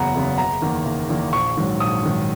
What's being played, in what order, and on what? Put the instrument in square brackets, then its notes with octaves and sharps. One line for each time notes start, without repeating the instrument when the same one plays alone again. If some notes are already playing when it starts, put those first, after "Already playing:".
Already playing: [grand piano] F#1 E2 C#3 F#3 B3 F#5 A#5
E2 C#3 F#3 B3
F#1 A#5
E2 D#3 A#3
F#1
E2 D#3 A#3
A#1 C#6
G#2 D#3 F#3
A#1 D#6
G#2 D#3 F#3